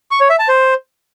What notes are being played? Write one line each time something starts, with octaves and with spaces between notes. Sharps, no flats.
C#6
C#5
E5
A5
C5